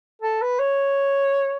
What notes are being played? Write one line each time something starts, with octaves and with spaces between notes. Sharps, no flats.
A4
B4
C#5